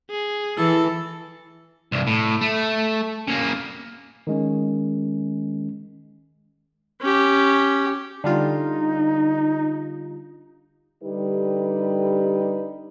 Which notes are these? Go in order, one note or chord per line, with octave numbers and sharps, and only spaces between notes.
G#4
E3 E4 A4
C2 G2
A2
A3
C#3 A#3
D#3 G#3 C#4
C#4 G4
D3 G3 D#4 F4
D3 G3 D#4 G4 B4